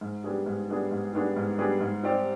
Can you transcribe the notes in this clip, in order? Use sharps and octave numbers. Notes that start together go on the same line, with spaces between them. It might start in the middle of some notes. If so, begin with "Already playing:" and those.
G#2
G3 B3 D4 G#4
G#2
G3 B3 D4 G#4
G#2
G3 B3 D4 G#4
G#2
G3 B3 D4 G#4
G#2
G3 C4 G4 D5